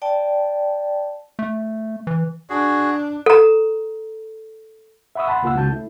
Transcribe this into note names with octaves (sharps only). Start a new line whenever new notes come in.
D5 G5 A5
A3
E3
D4 F#4 G#4
A4 A#5
E5 F#5 B5 C#6 D#6 E6
F#5 A5 B5 C6
C#2 A#3 F4 F#5 E6
C#2 D#3 F#4 A5 G6
A3 E4